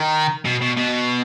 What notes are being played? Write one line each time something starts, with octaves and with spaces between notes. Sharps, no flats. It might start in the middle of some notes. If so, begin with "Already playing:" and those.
Already playing: D#3
B2
B2
B2